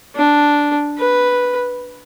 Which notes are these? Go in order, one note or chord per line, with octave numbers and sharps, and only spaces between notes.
D4
B4